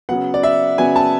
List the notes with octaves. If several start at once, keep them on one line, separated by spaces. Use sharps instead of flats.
C#3 F#3 B3 F#5
D5
E5
C#3 F#3 B3 G#5
A5